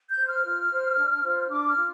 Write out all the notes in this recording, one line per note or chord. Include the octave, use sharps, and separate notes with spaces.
G6
C5
F6
F4
C5
D4
F4 C5
D4 D6
F6
F4